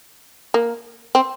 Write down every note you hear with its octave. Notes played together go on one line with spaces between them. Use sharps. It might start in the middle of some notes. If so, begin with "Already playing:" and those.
A#3
C4